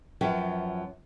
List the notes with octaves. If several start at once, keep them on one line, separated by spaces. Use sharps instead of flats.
F#2 F3 F#3 B4 E5 G5